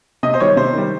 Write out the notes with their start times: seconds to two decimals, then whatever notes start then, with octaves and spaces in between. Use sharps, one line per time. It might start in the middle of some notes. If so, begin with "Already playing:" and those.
0.23 C3 D#5
0.34 C5
0.40 D#3 G3 C#5
0.56 C3 C5
0.73 D#3 G3